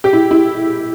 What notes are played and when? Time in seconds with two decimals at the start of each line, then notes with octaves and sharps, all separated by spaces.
0.04 G4
0.13 E4
0.31 E4